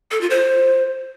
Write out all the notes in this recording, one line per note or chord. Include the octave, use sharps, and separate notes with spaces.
A4
F4
C5